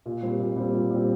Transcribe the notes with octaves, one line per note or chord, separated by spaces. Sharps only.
A#2
G3 C4
A#2
G3 C4
A#2
G3 C4